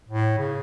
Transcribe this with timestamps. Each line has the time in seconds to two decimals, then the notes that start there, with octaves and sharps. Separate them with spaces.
0.09 A2
0.38 C#3